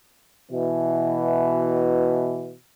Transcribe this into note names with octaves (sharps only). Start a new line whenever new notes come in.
B2 E3